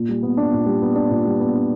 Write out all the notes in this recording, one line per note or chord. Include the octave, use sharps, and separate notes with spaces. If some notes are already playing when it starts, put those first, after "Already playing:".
Already playing: A#2
G3
B3
D4
A#2
G3
B3
D4
A#2
G3
B3
D4